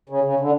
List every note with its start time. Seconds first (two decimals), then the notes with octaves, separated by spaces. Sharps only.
0.09 C#3
0.24 C#3
0.40 D3